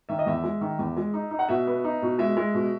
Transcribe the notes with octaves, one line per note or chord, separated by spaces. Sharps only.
D#3 E5
D#5
E2 E5
G#3
D#3
E2
G#3
D#4
D#4
F#5
B2 E5
B3
D#4
B2
G#3 E5
G#3
B2